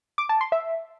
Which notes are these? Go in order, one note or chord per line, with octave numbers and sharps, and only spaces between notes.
D6
A5
C6
E5